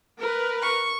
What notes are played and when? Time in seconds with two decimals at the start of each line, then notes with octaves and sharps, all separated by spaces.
0.19 A#4 B4
0.62 C#6